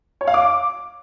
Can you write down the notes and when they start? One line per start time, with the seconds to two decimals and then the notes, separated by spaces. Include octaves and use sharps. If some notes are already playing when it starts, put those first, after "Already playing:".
0.21 C#5
0.27 F5
0.34 D6